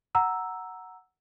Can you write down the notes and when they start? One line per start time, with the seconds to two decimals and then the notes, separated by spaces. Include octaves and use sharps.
0.15 F#5 A#5 E6